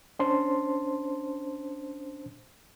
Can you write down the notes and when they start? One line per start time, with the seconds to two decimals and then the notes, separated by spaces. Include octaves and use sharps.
0.19 C#4 D4 C5 A5 C6